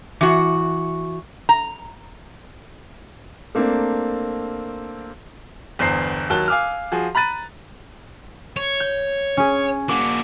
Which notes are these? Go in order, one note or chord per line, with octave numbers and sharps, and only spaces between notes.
E3 F#4
A#5
A3 A#3 C4 D4
G1 E2 C5 C7
D#2 F#3 A5 F#6 G7
F5 G#5 D6 E6 F6
F3 F#4 G#4
A#5 B5 F#6 A6 D#7
C#5
G6
C#4 G#4
A#3 F#4 D6